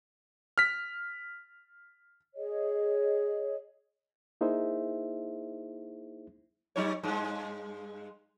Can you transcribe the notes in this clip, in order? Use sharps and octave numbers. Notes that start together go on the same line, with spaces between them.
F6 B6
G#4 C#5 D#5
A#3 D#4 E4 G#4 C5 E5
F#3 D#4 C#5
G2 G#3